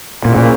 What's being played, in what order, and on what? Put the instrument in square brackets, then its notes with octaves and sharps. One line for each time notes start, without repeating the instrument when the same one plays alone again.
[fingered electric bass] A#2 [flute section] C#4 E4 G#4 C5
[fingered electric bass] A#2